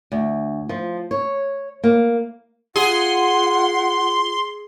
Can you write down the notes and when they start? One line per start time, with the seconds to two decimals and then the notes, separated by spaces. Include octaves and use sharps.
0.12 D2
0.69 F3
1.11 C#5
1.84 A#3
2.76 F4 G#4 F#5 C6